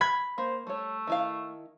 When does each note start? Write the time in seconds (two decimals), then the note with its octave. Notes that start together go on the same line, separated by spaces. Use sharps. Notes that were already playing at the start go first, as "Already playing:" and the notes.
0.01 B5 G#6
0.38 A#3 C5
0.67 G3 A3 C#5
1.07 D#3 E4 F5